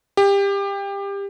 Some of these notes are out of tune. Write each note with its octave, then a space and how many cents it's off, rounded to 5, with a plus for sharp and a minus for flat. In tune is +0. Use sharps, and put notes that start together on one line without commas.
G4 +25